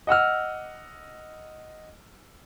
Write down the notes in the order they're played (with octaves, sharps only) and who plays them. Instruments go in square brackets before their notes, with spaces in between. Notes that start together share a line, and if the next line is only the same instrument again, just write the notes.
[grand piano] D#5 F#5 E6 F6